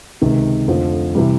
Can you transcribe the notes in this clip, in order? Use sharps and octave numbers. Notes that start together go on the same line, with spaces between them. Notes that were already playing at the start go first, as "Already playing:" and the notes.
C#2 C3 D#3
F2 D3 F3 A3
C3 E3 G3